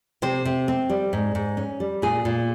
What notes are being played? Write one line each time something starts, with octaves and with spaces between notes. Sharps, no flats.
C3 C5
C3
C4
G3
G#2
G#2
C#4
G3
A#2 G#4
A#2